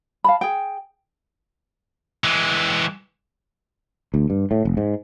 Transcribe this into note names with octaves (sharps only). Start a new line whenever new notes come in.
F5 A5 B5
G#4 G5
E3 G#3
D2
G2
A2
F1
G#2